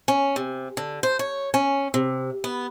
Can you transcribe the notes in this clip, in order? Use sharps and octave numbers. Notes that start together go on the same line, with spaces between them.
C#4
C3
D3
C5
C#5
C#4
C3
B3